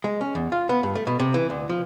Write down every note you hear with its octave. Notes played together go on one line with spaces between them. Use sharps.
G#3
C#4
E2
F4
B3
G2
A3
B2
C3
E3
D2
F3